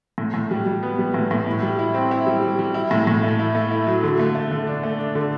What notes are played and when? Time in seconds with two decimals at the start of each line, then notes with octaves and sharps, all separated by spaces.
0.18 A2
0.34 A2
0.51 G3
0.66 G3
0.83 B3
0.99 G3
1.14 A2
1.31 A2
1.46 E4
1.63 G3
1.79 E4
1.94 C4
2.11 E4
2.27 G3
2.43 G3
2.59 G3
2.74 E4
2.91 A2
3.07 A2
3.23 A3
3.39 E4
3.55 A3
3.71 E4
3.87 F#3
4.03 D3
4.19 A3
4.35 A3
4.51 D3
4.67 D4
4.83 A3
4.99 D4
5.15 D3